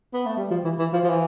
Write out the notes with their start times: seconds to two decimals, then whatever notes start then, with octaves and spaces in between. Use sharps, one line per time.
0.14 B3
0.26 A3
0.37 G3
0.51 F3
0.64 E3
0.79 E3
0.93 F3
1.04 F3
1.08 E3